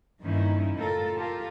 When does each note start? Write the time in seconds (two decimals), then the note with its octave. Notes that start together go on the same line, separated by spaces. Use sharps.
0.21 G2 D#3 A#3 C#4 D#4 E4
0.75 F#2 A2 C#3 F4 A4 A#4
1.16 F4 G4 A4 A#4